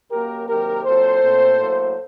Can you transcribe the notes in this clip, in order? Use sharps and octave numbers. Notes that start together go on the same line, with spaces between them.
F#2 F#3 A#3 G4 A#4
C3 D#3 F#3 A#3 G4 A#4
A#2 F#3 C4 A4 C5
A#2 A3 C4
A2 F#3 A#3